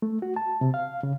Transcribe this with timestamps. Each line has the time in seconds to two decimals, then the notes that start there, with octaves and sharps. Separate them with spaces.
0.02 A3
0.22 F#4
0.36 A5
0.61 C3
0.74 F5
1.03 C#3